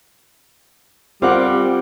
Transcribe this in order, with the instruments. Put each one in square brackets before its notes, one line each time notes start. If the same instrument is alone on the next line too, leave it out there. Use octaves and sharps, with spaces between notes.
[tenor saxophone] G3 [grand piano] C4 [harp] F4 A#4 F#5